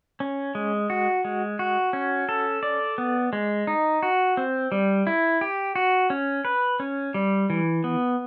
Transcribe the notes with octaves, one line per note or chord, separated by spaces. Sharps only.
C#4
G#3
F#4
G#3
F#4
C#4
A4
D5
B3
G#3
D#4
F#4
C4
G3
E4
G4
F#4
C#4
B4
C#4
G3
E3
B3